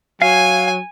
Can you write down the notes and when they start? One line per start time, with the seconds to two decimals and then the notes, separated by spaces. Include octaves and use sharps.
0.22 F#3 F5 G#5